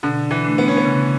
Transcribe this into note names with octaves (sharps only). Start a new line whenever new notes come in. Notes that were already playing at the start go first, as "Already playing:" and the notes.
B2 D3
E3
A3 D4
B3
C#4
B3
C#3